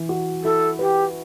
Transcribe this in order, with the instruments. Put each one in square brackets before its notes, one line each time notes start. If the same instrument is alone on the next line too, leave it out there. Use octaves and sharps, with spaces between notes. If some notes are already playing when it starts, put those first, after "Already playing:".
Already playing: [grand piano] E3
F#4
[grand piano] E4 [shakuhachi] A4
[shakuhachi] G4 [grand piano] B4